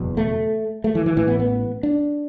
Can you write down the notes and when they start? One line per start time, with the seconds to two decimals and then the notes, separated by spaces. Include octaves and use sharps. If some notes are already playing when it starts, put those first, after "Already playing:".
Already playing: F#1 E2 B2
0.17 A3
0.84 A3
0.95 E3
1.06 E3
1.17 A1 A2 E3
1.28 B3
1.40 B3
1.83 D4